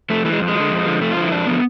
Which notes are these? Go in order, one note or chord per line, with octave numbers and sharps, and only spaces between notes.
F2 A3
E3 A3
G#3
F2
G#3
F3
D3
F2
D3 F3
F2 A3
F4
D3 F3 E4
F2 D4
D3 F3 B3